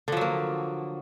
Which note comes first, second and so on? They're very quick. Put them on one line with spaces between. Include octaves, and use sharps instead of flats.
D3 F3 F#3 A#3